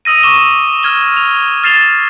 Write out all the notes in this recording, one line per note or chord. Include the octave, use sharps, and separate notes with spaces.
D#6 E6 A#6 D#7
C#6 D6 E6 E7 G7
F6 G#6 G7
F7
F6 A6 C7 E7 F7 G7